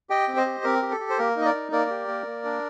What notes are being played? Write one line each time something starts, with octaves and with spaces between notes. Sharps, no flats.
G4 D#5 G5
C4
C5 D#5
G4
C4 A#4
G4
A4
G4
C5
A#3 A#4
D#4 D#5
A#4 D5
D#4
A#3 A#4 D5
G4
A#3
A#3
D4